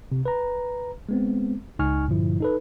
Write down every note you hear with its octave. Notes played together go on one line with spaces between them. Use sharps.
C3
B4 A#5
G#3 B3 C4
C#2 D#4 G#5 C#6 F6
G2 A#2 D3 F3 E4
D#4 A4 B4